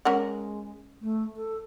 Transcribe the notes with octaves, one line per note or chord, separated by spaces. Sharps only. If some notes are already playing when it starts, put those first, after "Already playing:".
G#3 C#4 A#4 F#5
A3
A4